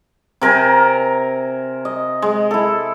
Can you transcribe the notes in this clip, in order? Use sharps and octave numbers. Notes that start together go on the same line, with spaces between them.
C3 A#4 C5 G#5
D#5
G#3
E4 A4